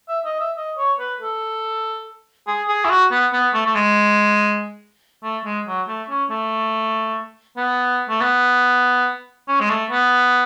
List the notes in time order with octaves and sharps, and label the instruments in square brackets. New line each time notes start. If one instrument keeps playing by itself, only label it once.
[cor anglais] E5
D#5
E5
D#5
C#5
B4
A4
G#4
G#4
E4
F#4
B3
B3
A3
A3
G#3
A3
G#3
F#3
A3
C#4
A3
B3
A3
B3
C#4
G#3
A3
B3